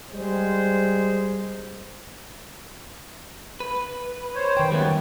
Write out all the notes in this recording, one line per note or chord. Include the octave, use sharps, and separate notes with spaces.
G3 G#3 C5
B4
C5 C#5
D#3 G5
F#2 G3 A3 B3